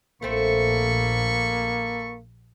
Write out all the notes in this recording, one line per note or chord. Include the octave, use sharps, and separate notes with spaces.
A#1 A3 A#3 C4 A4 B5 C#6